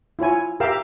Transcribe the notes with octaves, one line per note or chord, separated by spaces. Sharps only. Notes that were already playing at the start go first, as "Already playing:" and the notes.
E4 F4 C#5 G#5
G4 A#4 E5 F5 G5 E6